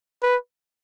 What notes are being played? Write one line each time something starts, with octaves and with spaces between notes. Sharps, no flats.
B4